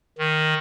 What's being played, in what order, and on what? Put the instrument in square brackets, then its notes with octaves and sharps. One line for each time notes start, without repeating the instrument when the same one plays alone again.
[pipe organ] D#3